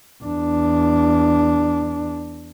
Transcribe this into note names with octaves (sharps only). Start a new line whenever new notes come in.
E2 D4